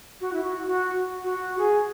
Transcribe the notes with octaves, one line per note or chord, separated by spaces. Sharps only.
F#4
E4
F#4
F#4
F#4
G#4